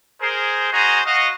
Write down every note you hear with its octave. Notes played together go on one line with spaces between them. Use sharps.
G#4 A#4 C5
F#4 G#4 C5 D#5 G#5 A#5
F#4 D#5 F5